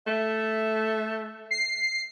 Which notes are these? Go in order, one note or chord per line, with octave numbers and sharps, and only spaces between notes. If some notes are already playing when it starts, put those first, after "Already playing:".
A3 E5
C7